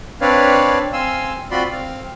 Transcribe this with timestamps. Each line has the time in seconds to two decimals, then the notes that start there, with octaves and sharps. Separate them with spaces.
0.21 C4 D4 B4 C#5 D5 F5
0.93 C4 F5 G#5 C6 E6
1.51 C4 F4 F#4 D5 B5 C6
1.71 C4 F5